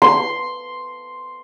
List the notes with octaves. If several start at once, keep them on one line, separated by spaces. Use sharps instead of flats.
C6